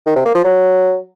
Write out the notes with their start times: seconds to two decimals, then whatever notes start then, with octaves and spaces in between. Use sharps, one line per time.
0.06 D#3
0.16 C3
0.25 A#3
0.35 F3
0.44 F#3